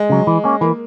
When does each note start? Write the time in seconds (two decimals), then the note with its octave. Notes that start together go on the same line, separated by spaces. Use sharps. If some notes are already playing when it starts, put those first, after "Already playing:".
Already playing: G#3
0.10 C#3 F#3
0.27 E3
0.44 A#3 C#4
0.61 E3 A#3